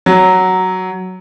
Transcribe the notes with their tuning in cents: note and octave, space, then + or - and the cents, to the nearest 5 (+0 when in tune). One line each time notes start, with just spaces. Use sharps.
F#3 +5